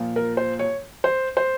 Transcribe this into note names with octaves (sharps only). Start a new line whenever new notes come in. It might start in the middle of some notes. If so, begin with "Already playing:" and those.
Already playing: A#2 F3
A#4
C5
C#5
C5
C5